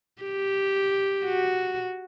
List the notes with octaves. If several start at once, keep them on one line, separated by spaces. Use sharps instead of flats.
G4
F#4